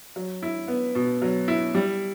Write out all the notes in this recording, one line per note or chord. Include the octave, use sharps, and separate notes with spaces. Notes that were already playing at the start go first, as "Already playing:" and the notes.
F#3
E4
B3
B2
F#3
E4
G3